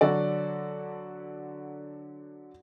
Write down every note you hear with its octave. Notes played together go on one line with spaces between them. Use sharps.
D3 F#3 F#4 A4 D5